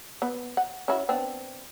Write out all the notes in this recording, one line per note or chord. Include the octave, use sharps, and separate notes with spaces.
B3
F#5
C#4 E4 F#4
B3 C4 D4